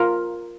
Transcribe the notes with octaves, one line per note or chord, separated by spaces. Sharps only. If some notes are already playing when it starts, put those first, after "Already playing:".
Already playing: F4 A#4